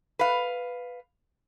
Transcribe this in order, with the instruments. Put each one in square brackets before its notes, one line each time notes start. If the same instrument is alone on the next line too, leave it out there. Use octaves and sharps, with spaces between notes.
[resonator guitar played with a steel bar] B4 F5